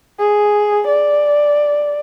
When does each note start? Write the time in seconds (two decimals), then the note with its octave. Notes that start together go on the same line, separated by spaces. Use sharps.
0.19 G#4
0.87 D5